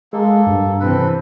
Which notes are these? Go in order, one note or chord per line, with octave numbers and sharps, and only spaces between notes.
G#3 A#3 A4
G2
C3 E3 C4 A4 B4